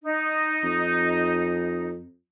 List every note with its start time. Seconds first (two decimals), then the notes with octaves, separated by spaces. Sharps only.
0.03 D#4
0.64 F2